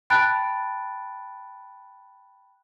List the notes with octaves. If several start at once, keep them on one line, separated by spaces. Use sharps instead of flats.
G5 A5 B5 F#6 A6 D7